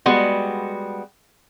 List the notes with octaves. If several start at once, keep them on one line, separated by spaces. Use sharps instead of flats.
G3 G#3 B3 F#4